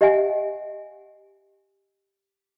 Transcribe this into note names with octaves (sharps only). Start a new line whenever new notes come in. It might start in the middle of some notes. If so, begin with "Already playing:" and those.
G4 D#5 E5 F#5 G#5